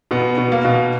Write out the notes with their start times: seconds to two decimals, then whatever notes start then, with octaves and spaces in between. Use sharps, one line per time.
0.11 B2 B3
0.38 B2
0.52 A#3
0.65 B2